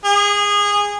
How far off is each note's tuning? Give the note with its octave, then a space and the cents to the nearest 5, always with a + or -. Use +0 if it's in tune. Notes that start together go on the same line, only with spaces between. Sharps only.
G#4 -20